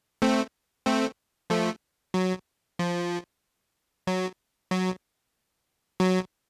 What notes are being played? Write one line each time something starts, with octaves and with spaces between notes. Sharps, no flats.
A3 C4
A3 C4
F3 A3
F#3
F3
F#3
F#3
F#3